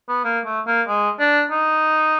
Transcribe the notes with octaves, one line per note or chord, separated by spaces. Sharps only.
B3
A#3
A3
A#3
G#3
D4
D#4